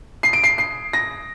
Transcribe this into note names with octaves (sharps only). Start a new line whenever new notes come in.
C7
D7
C7
C7
A#6